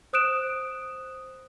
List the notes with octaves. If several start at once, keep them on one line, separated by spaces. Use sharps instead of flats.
C5 D#6 F#6 D7 E7